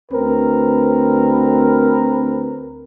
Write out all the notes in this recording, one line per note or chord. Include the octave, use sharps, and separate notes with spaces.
D2 C4 A#4 B4